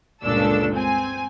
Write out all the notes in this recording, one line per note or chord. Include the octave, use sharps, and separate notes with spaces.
G1 C#2 A#2 D4 A4 E6
C4 G#5